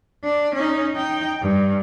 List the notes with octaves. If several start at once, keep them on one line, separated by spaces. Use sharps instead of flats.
D4
C#4 D#4
D#4 G5
G2